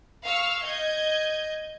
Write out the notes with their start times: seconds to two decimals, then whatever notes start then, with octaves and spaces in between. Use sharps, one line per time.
0.25 F5 C#6 E6 F6
0.64 D#5 G6 G#6